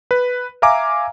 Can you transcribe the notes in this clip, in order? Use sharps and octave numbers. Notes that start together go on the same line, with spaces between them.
B4
E5 F5 G#5 A#5 D6